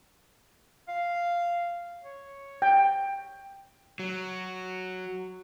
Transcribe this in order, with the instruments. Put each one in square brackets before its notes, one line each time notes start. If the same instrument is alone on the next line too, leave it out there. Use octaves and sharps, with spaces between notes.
[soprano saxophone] F5
C#5
[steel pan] G5
[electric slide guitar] F#3